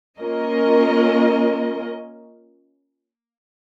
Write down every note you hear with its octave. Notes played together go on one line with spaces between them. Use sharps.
A#3 C#4 F4 A#4 D#5